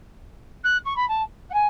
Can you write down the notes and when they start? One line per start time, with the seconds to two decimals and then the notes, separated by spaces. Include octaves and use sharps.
0.64 F#6
0.85 C#6
0.96 B5
1.08 A5
1.49 F#5
1.53 G#5